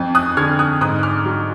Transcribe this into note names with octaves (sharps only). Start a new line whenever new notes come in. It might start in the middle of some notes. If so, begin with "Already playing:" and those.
Already playing: F2
D#6 F#6
D3 F6 G#6
D#6 F#6
G#2 D#6 F#6
D6 F6
F#3